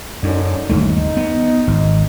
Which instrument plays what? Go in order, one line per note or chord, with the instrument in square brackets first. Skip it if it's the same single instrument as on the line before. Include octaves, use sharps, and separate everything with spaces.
[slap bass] F#2 [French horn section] D3 C#4 D#4
[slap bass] G1 D#2 A3 [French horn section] D#4
[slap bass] B3
G#1